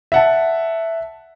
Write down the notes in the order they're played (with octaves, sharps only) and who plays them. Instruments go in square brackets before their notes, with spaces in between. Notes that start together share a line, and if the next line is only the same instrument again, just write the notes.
[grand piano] E5 F#5 A5